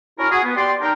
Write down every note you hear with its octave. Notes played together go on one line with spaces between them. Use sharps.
C#4 D4 E4 F#4 A#4
F#4 G#4
B3
G4 D5 C6
D4 D#4 A#4 G5